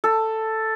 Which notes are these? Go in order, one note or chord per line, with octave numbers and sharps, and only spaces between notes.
A4